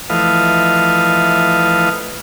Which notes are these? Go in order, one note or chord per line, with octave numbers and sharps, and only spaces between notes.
E3 F3 A3 B4 D#5 F5